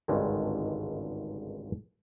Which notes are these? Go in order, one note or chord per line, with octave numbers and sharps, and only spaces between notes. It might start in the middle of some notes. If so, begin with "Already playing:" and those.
G#1 C#2 G2 D3 D#3 G#3